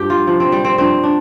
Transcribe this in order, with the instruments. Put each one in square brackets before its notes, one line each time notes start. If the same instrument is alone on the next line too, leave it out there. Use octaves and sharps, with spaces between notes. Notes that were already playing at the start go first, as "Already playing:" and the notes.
Already playing: [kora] G2 F3 G4
F4
C3 F3
C4
G3
C4
G2 F3 C4
D4